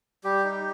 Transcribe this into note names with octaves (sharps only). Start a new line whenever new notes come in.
G3 G4
D#4